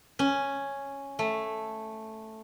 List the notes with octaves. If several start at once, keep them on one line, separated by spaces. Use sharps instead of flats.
C#4
A3